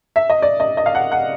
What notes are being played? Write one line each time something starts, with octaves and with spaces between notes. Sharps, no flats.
E5
D#5
D5
D#5
D#5
F5
F#5
F#5